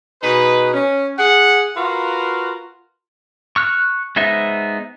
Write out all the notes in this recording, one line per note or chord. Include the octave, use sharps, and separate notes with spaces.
B2 D#4 G#4 B4
C#4
G#4 F#5
F4 F#4 A#4 B4 F5
C#6 F6 F#6
G#3 B3 D#4 C5 E5